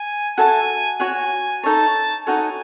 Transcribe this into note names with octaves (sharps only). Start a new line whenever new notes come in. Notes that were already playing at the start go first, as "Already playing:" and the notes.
Already playing: G#5
F#4 A4 E5 G#5 A5
F#4 C#5 F#5 G#5
D#4 A4 C#5 A5
D#4 F#4 A4 C#5 G#5